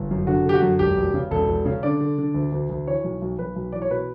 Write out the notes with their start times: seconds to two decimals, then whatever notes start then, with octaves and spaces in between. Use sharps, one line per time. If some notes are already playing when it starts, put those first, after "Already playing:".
Already playing: G1
0.11 F#2
0.27 D3 F#4
0.46 D3 G4
0.54 F#4
0.62 F#2
0.79 E1 G4
0.97 E1
1.14 C#3
1.31 E1 A4
1.49 E1
1.66 C#3
1.83 D3 D5
2.00 D3
2.18 D3
2.34 D2
2.52 D2
2.70 D2
2.87 E3 C#5
3.04 B1
3.22 B1
3.38 B1 B4
3.56 B1
3.72 E3 D5
3.82 C#5
3.91 B2 B4